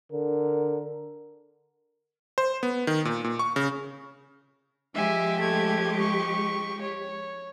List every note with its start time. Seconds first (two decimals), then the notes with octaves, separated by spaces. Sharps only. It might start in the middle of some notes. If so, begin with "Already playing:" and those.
0.12 D3 A#4
2.38 C5
2.63 B3
2.87 D#3
3.05 A#2
3.24 A#2
3.39 C#6
3.56 C#3
4.95 F3 G#3 G4 E5 G#5
5.40 A3 G#6
6.00 C#6
6.82 C#5